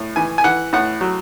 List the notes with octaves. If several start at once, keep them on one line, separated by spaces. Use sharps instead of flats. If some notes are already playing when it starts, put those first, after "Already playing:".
Already playing: A2
E3 G#5
G#5
E3 F#5
A2 F#5
F#3